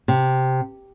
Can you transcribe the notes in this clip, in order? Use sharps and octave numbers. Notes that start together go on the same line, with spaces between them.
C3